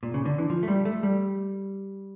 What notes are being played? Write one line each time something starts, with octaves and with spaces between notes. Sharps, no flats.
A#2
C#3
D3
E3
F3
A3
G3
A3
G3